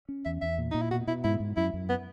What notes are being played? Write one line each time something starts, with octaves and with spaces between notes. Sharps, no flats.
C#4
E2 E5
E2 E5
A#2
A#2 D#4
E4
B2 F#4
B2 E4
G#2 E4
G#2
F#2 E4
F#2
B3